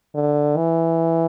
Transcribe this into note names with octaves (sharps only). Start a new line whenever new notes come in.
D3
E3